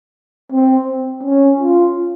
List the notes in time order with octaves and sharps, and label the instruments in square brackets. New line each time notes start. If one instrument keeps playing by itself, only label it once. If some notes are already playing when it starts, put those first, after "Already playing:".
[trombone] C4
C#4
F4